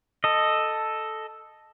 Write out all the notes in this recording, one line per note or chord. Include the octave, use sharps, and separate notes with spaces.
A4 D#5